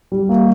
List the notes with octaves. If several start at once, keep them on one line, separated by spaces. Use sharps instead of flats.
G3
A#3